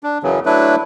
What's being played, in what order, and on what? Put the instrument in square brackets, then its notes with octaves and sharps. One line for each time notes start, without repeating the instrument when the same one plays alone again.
[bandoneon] D4
F#2 C#3 E3 F#3
F#3 A3 D4 E4 B4